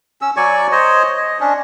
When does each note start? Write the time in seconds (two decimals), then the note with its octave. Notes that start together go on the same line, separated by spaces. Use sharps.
0.22 C#4 E6
0.37 F#3 D5 G#5 C#6
0.72 C5 C#5 D#5
1.17 D#5
1.40 C#4 D4